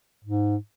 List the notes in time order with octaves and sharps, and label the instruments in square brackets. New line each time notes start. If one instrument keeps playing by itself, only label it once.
[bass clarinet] G#2